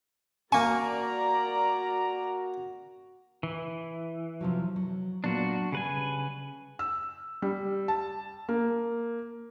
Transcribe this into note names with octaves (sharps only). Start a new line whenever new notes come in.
A#3 F#4 A#4 D5 G#5 A#5 C#6
E3
C3 F3 F#3
F#3
A#2 F#3 B3 D4 F#4
C#3 G3 B4 G#5
E6
G3
A5
A#3